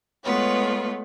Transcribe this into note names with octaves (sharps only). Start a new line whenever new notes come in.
G#3 A3 B3 F4 B4 C#5